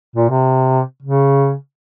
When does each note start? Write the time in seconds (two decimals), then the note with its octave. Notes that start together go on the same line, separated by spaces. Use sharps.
0.16 A#2
0.29 C3
1.03 C#3